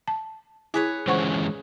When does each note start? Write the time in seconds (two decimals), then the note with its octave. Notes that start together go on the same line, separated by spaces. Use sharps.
0.08 A5
0.74 E4 G#4 B4 C#5
1.07 E3 G#3 C#4 C5 F#5 C#6